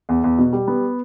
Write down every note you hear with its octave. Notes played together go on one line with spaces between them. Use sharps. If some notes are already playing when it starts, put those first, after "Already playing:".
E2
E2
B2
G3
B3